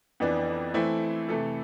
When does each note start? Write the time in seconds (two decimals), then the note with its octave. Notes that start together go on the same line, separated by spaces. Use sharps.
0.20 F2 E3 B3 D4
0.74 E3 A3 C4 E4
1.29 C3 E3 A3 E4 A4